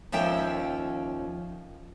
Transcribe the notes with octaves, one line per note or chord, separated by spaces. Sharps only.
D#2 F3 C#4 E5 G5